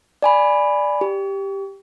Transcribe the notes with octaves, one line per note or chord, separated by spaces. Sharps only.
D5 G#5 B5
G4